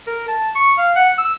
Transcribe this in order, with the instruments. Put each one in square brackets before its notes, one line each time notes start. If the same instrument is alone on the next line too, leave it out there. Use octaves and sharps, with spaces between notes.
[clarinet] A#4
A5
C#6
F5
F#5
E6